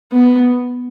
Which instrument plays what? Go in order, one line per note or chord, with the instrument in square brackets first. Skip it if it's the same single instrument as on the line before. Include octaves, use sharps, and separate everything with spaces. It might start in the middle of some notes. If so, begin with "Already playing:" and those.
[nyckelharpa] B3